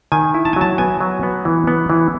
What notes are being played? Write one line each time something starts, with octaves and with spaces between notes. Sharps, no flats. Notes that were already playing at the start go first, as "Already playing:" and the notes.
D#3 G#5
E4
A5
G#5
F#3 A5
B3 G#5
F#3
B3
E3
B3
E3